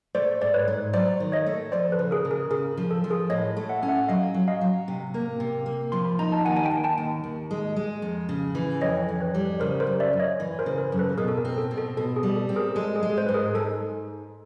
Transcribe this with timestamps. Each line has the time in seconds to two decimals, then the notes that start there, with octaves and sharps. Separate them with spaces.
0.15 A3 C5 D5
0.41 G#2 D5
0.54 B4 C#5
0.68 G#2
0.93 F#3 C5 D5
1.20 D#3
1.32 C#5 D#5
1.46 A3
1.72 F3 C5 D5
1.92 A4 B4
1.99 C#3
2.11 G#4 A#4
2.25 C#3
2.31 G#4 A#4
2.51 C#3 G#4 A#4
2.77 F3
2.91 A4
3.04 F3
3.10 G#4 A#4
3.30 A2 C#5 D#5
3.57 A3
3.69 E5 F#5
3.82 C#4
3.88 E5 F#5
4.08 F#3 D#5 F5
4.34 F#3
4.48 D#5 F5
4.61 F#3
4.88 C3
5.14 A#3
5.40 C3
5.66 A#3
5.92 F3 C6
6.05 B5
6.19 D#4 A#5
6.32 A5
6.45 D#2 F#5 G#5
6.57 G#5
6.65 G5 A5
6.71 D#2
6.84 G5 A5
6.98 D#2
7.24 D#2
7.51 G#3
7.76 G#3
8.02 F2
8.29 C#3
8.55 E3
8.81 F2 C#5 D#5
9.09 F2
9.20 B4 C#5
9.34 G3
9.60 C#3 A#4 C5
9.80 A#4 C5
9.87 F#2
10.00 D5 E5
10.13 F#2
10.19 C#5 D#5
10.40 E3
10.59 A#4 C5
10.66 C#3
10.78 A#4 C5
10.92 F#2
10.98 A4 B4
11.18 B2 G#4 A#4
11.28 A4
11.37 G#4 A#4
11.45 C4
11.58 A4
11.71 B2
11.78 A4
11.97 B2 A4
12.16 G#4
12.23 G3
12.36 A4
12.49 C4
12.56 G#4 A#4
12.76 G#3 A4
12.96 G#4
13.03 G#3
13.18 C5
13.26 G#2 B4
13.34 G#4 A#4
13.55 G#2 A4